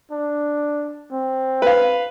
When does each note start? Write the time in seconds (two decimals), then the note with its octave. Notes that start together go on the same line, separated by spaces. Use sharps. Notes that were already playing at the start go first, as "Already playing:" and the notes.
0.12 D4
1.12 C4
1.62 B4 F5